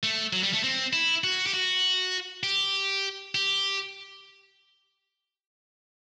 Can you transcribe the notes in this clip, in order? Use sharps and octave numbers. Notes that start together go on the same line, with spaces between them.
A3
F#3
G3
A3
C4
E4
F#4
G4
F#4
G4
G4